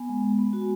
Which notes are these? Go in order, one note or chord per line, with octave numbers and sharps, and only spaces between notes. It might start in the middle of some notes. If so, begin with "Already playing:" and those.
Already playing: B3 G#5
G#3
G#3
B3
F#4